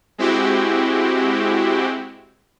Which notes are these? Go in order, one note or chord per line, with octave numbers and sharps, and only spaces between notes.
G#3 C4 E4 F#4 G4